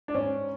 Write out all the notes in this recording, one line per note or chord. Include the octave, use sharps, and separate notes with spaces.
D4
G#2 C#4